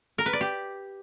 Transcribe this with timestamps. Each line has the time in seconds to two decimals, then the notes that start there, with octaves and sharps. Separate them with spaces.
0.18 A#4
0.26 B4
0.33 D5
0.41 G4